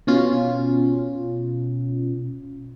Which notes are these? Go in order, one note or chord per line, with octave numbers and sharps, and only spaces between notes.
B2 C#4 F4